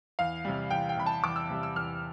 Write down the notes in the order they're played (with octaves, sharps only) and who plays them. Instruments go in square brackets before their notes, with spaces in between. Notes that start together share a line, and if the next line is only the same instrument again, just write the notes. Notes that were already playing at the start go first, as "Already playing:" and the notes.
[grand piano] E2 F5
C3 G3
E2 G5
G5
C3 G3 B5
A5
E2 D6
E6
C3 G3
E6
E2 F6